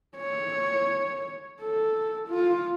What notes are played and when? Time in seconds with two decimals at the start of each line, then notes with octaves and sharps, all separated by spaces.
0.17 C#5
1.61 A4
2.28 F4